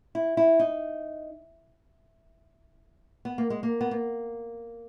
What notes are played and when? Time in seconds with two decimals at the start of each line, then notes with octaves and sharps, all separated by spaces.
0.15 E4
0.37 E4
0.59 D#4
3.25 B3
3.38 A#3
3.50 G#3
3.63 A#3
3.81 B3
3.91 A#3